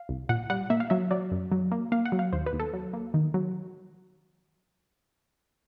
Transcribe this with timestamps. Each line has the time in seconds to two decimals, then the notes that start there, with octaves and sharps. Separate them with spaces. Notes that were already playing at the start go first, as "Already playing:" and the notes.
Already playing: F5
0.09 C2
0.29 A#2 F#5
0.50 G3 F#5
0.70 A#3 E5
0.80 F5
0.90 F#3 E5
1.11 F#3 D5
1.31 F#2
1.52 F#3
1.72 A#3
1.92 A#3 F5
2.05 F#5
2.12 F#3
2.19 F5
2.32 D#2 C5
2.46 B4
2.53 D#2
2.60 A4
2.73 F#3
2.93 A#3
3.14 D#3
3.34 F#3